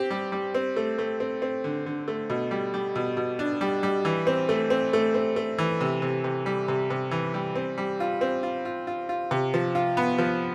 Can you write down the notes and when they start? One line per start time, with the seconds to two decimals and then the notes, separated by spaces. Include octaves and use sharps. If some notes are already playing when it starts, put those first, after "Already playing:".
Already playing: C4 G4
0.10 G3
0.32 G3
0.55 C4
0.76 A3
0.98 A3
1.20 C4
1.42 C4
1.64 D3
1.86 D3
2.08 A3
2.30 B2
2.51 G3
2.74 G3
2.96 B2
3.17 B2
3.39 D4
3.61 G3
3.83 G3
4.05 E3
4.27 C4
4.49 A3
4.70 C4
4.93 A3
5.14 C4
5.36 A3
5.58 E3
5.81 C3
6.02 C3
6.24 C3
6.46 G3
6.68 C3
6.90 C3
7.11 E3
7.34 G3
7.56 C4
7.78 G3
8.00 F4
8.21 C4
8.43 F4
8.65 F4
8.87 F4
9.09 F4
9.31 C3
9.54 F3
9.75 F4
9.97 B3
10.18 F3